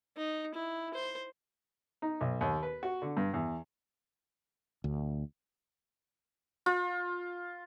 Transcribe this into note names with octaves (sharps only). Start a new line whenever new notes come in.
D#4
E4
C5
D#4
B1
D#2
B4
F#4
D3
G2
E2
D2
F4